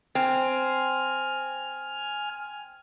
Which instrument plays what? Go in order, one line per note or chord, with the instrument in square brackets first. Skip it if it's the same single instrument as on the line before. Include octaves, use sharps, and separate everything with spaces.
[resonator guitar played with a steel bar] C4 [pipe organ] G#5 F6